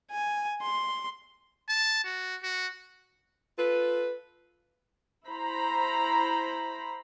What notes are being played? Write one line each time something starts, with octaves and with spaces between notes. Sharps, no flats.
G#5
C6
A5
F#4
F#4
F4 A4 B4
E4 C5 A#5 B5